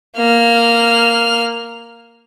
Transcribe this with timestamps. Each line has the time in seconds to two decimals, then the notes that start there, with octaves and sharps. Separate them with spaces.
0.17 A#3 F6